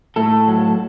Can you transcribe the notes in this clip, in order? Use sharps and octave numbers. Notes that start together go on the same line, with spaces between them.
A2 A4
F#3